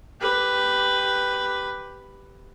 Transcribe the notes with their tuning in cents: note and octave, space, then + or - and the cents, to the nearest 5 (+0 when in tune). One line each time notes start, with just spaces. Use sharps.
G4 +0 B4 +5